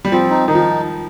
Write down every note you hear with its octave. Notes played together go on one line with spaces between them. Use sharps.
G3
F3 C4
D#4
D#3 D#4
F3